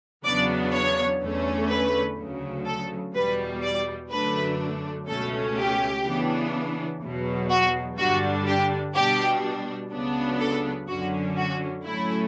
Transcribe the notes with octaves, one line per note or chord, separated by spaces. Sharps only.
E2 C#3 F#3 B3 D4 D5
C#5
E2 D3 A3 C#4
B4
D2 C#3 F#3
A4
E2 B2 G3 B4
D5
F#2 D3 F#3 A3 D4 B4
C#2 B2 A3 C#4 A4
G4
C#3 E3 B3 D4
E2 B2 F#3
F#4
G2 D3 G3 D4 F#4
G4
B2 G3 D4 G4
C#2 C#3 F#3 B3 D4
A4
F#2 D3 F#3 C#4 F#4
F#4
A2 F#3 A3 C#4 E4